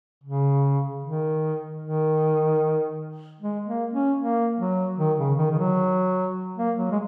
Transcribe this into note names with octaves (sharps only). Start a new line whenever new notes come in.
C#3
D#3
D#3
G#3
A#3
C#4
A#3
F#3
D#3
C#3
D#3
D#3
F#3
A#3
F#3
G#3